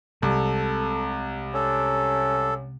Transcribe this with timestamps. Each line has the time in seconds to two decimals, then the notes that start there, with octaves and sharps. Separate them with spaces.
0.23 C2 C3 G#3 C4 A4
1.54 C#4 A4